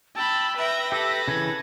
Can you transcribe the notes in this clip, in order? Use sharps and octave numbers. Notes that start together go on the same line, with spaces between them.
G5 A5 B5 E6
B4 E5 G5 A#6
G4 A4 E5 E6
C#3 E3 G#6